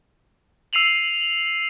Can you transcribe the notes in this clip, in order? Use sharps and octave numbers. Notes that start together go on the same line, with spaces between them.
E6 C7 D#7 F7 F#7